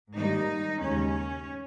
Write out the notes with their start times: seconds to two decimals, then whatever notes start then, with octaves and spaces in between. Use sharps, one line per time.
0.15 G#2 D#3 G3 A#3 D#4
0.80 D#2 C#3 G#3 C#4